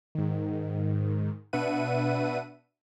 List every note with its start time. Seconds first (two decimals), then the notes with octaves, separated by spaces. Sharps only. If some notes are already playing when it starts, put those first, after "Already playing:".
0.15 G#2 D#3
1.53 B2 D4 B4 E5 F#5 D#7